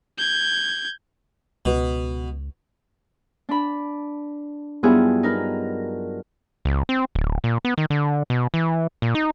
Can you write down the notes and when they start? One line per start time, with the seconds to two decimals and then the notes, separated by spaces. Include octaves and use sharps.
0.18 G6 G#6
1.65 C#2 B2
3.49 D4 B5
4.83 G2 F#3 B3 E4 F4 G#4
5.23 D#4 A#4 B4
6.65 C#2
6.89 C4
7.15 D1
7.44 A#2
7.65 B3
7.78 D#3
7.90 D3
8.30 B2
8.54 E3
9.02 A#2
9.15 D#4